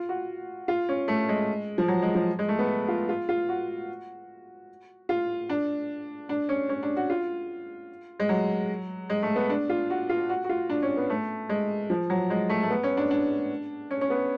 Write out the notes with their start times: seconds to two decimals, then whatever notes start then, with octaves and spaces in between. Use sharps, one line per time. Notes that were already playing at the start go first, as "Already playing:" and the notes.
Already playing: F4
0.09 F#4
0.68 F4
0.89 C#4
1.08 A3
1.29 G#3
1.78 F3
1.88 F#3
2.02 G#3
2.15 F3
2.39 G#3
2.49 A3
2.59 B3
2.88 F4
3.09 F4
3.29 F4
3.49 F#4
5.09 F4
5.49 D4
6.29 D4
6.49 C#4
6.69 C#4
6.83 D4
6.96 F#4
7.10 F4
8.20 G#3
8.29 F#3
9.10 G#3
9.23 A3
9.36 B3
9.49 D4
9.69 F4
9.90 F#4
10.09 F4
10.29 F#4
10.44 F#4
10.49 F4
10.69 D4
10.82 C#4
10.97 B3
11.10 A3
11.49 G#3
11.90 F3
12.10 F#3
12.30 G#3
12.50 A3
12.63 A3
12.70 B3
12.83 C#4
12.97 D4
13.11 D4
13.91 C#4
14.01 C#4
14.10 B3